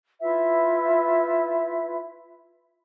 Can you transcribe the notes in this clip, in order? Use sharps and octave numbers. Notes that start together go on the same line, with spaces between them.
E4 F4 B4 E5